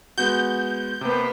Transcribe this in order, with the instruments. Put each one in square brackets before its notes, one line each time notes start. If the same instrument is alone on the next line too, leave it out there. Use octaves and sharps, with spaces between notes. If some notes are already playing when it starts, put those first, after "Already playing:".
[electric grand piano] G#3 B3 F#4 [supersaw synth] G6
[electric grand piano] C3 [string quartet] A#3 B3